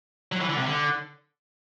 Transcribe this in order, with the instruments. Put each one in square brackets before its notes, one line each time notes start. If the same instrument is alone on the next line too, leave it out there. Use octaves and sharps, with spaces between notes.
[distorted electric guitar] F#3
E3
D3
C3
D3